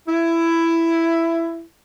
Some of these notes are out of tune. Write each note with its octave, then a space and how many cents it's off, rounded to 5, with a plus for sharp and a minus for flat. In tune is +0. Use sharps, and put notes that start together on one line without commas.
E4 +10